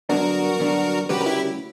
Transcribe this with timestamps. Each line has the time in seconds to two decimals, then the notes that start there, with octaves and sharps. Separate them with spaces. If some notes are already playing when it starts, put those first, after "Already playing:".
0.09 G2 D3 F#3 B3 D4 F#4 A#4
0.59 G2 D3 F#3 B3 D4
1.09 D2 C#3 G3 C#4 F#4 G4 B4
1.21 A#4
1.26 E4 G4